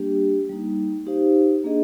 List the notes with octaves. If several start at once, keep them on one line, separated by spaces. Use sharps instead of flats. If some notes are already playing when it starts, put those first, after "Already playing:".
Already playing: G3 A#3 D4 G4
G3 A#3 D#4
D#4 G4 C5 F5
A#3 D4 G#4 D#5